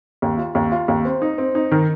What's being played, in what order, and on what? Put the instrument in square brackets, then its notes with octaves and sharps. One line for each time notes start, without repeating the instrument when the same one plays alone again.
[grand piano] D#2
F4
D#2
F4
D#2
C4
D#4
C4
D#4
D#3